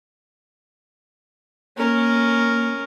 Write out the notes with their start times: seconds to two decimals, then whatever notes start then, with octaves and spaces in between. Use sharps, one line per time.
1.78 A#3 C#4 A#4